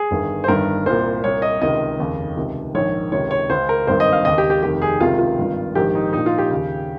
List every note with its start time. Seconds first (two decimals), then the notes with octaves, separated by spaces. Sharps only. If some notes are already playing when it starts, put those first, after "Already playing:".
Already playing: G#4
0.11 G1 G2 D#3
0.44 C5
0.48 G1 G2 D#3 A#4
0.86 C2 A#2 C5
1.24 C2 A#2 C#5
1.42 D#5
1.61 C#2 C3 D#3 D#5
1.99 F1 D#2 C#3
2.37 C#2 C3 D#3
2.74 A#1 G#2 D#3 C#5
3.12 C#2 C3 D#3 C#5
3.31 C#5
3.50 C#2 C#3 C5
3.69 A#4
3.87 G#1 G2 D#3 C5
4.00 D#5
4.12 F5
4.25 D#2 C#3 D#5
4.38 G4
4.50 G4
4.63 F1 D#2 D#3 G4
4.82 G#4
5.00 C#2 C3 D#3 F4
5.19 F4
5.38 G#1 G2 D#3
5.75 A#1 G#2 D#3 G4
5.95 D#4
6.13 A#1 A#2 D#4
6.26 F4
6.38 G4
6.51 D#2 C#3